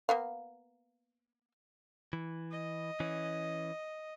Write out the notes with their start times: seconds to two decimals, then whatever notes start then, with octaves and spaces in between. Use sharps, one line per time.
0.09 A#3 B3 F5
2.13 E3
2.51 D#5
3.00 E3 C#4